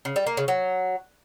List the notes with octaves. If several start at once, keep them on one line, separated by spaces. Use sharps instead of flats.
C#3
G3
A#3
C#3
F#3